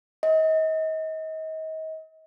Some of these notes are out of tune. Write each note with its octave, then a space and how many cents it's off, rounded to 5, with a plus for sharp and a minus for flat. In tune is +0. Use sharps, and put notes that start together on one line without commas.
D#5 +35